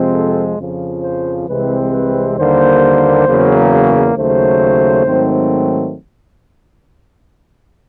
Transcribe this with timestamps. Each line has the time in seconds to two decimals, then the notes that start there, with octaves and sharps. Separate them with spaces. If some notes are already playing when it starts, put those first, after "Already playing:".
Already playing: F2 C3 F3 G#3 C4
0.12 A4
0.57 F2 C#3 F3
1.02 C5
1.47 C2 C3 E3 G#3 C4 B4
1.92 B4
2.37 D#2 D3 G3 A#3 C5
3.27 E2 C#3 F#3 A#3
4.16 D#2 C#3 F#3 A3 C5
5.06 G#2 D#3 F#3 A3 C4